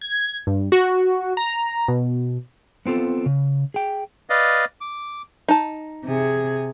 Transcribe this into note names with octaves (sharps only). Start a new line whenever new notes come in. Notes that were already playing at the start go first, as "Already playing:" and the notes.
G#6
G2
F#4
A#5
B2
B3 C4 F4 A4
C#3
G#4 G5
B4 D5 D#5 F5
D6
D#4 A5
C3 G#4